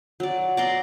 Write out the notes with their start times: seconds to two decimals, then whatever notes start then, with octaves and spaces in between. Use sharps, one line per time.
0.20 F#3 D5
0.57 D5 A#5 C6